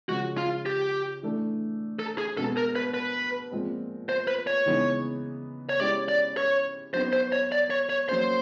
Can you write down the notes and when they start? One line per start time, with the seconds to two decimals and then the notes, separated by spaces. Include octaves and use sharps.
0.09 C#3 F3 G#3 F#4
0.37 F4
0.66 G4
1.23 E3 A3 D4
1.99 A4
2.18 G#4
2.37 B2 G#3 B3 A4
2.57 A#4
2.76 B4
2.94 B4
3.52 A#2 F3 G#3 C4
4.09 C5
4.28 B4
4.47 C#5
4.66 C#3 E3 G#3 B3 D#4
5.69 C#5
5.80 G#3 C#4 E4 G4 D5
6.08 D5
6.37 C#5
6.94 F#3 B3 D#4 F#4 C5
7.13 C5
7.32 C#5
7.52 D5
7.70 C#5
7.90 C#5
8.09 F#3 A#3 C#4 C5